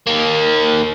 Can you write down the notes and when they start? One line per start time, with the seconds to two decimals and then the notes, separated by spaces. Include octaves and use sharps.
0.07 D#3 A#3